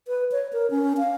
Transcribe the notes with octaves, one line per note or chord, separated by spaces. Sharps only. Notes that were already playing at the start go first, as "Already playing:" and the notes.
B4
C#5
A#4
C#4
F5